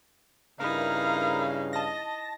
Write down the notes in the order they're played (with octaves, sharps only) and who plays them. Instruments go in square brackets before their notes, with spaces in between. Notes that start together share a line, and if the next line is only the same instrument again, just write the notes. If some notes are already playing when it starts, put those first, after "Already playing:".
[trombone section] G2 C#3 [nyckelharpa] D#4 E4 [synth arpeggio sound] A#4 B4 [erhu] F5
[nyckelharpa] D#5 [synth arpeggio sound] A5 A#6